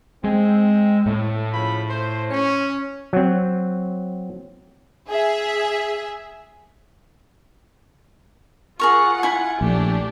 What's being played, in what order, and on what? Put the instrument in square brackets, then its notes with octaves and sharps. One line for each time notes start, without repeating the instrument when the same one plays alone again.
[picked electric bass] G#3 [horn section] C4
[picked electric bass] A2
[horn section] C#3 F3 B5
C5
C#4
[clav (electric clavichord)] F#3 C4
[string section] G#4 E5
[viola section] F4 F#5 [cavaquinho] G#4 A#4 C#6
[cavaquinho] E4 G#5
[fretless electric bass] A#1 [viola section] A3 D4 G4